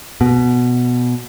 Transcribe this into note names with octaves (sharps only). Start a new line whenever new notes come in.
B2